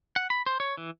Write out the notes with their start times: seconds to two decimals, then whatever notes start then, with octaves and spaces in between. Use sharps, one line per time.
0.16 F#5
0.30 B5
0.46 C5
0.60 C#5
0.77 E3